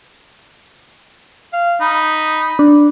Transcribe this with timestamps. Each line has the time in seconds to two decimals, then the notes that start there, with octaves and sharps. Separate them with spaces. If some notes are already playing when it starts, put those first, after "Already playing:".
1.53 F5
1.81 D#4 B5
2.59 D4